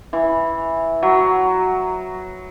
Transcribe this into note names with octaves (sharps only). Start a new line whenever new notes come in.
E3
F#3